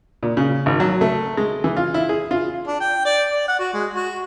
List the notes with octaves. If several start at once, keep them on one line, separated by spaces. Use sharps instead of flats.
A#2
C#3
G#1
F#3
A3
G#3
E3
F4
E4
G#4
F4
D4
G5
D5
D5
F#5
F#4
G#3
F#4